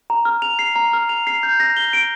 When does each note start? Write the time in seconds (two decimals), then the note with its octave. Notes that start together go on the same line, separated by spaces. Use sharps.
0.10 A#5
0.25 F6
0.42 F7
0.59 C7
0.76 A#5
0.93 F6
1.09 F7
1.27 C7
1.43 G6
1.60 A#6
1.77 G7
1.93 D7